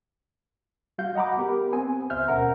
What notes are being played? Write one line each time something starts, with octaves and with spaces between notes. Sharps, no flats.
G3 F#4 F5 G6
D#5 F#5 A#5 B5 D6
B3 G4 A#4
B3 C4 G#5
C#2 C5 E5 F6 G6
D#2 B2 C#4 A#4 F#5 A#5